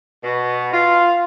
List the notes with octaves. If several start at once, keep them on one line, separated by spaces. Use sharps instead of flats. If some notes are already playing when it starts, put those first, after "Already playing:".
B2
F4